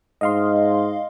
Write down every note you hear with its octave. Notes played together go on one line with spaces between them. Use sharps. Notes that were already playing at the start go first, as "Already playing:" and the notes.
G#2 D#5 F5 C6